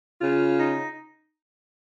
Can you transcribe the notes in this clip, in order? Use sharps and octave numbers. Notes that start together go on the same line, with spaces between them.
C#3 F4
D#4